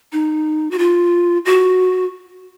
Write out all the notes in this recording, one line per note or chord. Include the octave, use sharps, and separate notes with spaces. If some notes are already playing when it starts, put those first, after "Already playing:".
D#4
F#4
F4
F#4